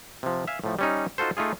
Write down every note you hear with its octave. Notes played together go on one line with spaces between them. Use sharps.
C3 F3
E5 F5 G#5
A2 F3 A3
G3 C#4 D#4
D#4 F4 F#4 A4 C5
A3 D#4 F4 G#4